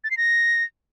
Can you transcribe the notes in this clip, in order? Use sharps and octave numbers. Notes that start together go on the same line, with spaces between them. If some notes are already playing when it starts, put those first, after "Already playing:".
A6
C7
A#6